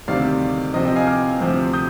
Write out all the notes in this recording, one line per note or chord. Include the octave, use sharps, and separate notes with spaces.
D2 C3 D#3 G3 C4 D5 F5
C3 F3 C4 D#5
D#5 G5
F5 G#5
D6 F6
D2 C3 F3 C4
D#6 G6